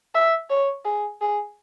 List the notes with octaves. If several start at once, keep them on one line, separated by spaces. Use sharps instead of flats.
E5
C#5
G#4
G#4